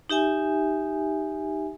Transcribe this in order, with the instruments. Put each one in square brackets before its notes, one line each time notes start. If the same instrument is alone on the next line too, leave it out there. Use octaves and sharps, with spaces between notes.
[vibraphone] D#4 G4 E5 G#5